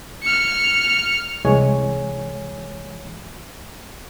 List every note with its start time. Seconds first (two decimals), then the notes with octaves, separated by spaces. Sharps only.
0.23 F6 C#7
1.45 C2 E3 G#3 C#5 G#5